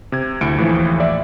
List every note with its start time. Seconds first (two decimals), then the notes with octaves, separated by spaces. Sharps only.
0.12 C3 G#6
0.41 D2 E4 C#7 D7
0.57 D#2 A2 E3 F3
1.00 D5 E5